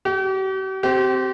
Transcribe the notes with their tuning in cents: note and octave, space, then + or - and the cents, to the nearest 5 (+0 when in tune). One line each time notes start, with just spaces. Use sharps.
G4 -45 G5 -45
C4 +0 G4 -35